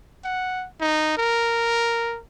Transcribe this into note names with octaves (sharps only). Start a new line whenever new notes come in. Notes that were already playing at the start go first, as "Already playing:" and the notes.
F#5
D#4
A#4